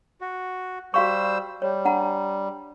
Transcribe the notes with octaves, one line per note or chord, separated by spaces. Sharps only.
F#4
G3 F#4 C5 F5 C#6 E6
G3 C#5
D4 F#5 A#5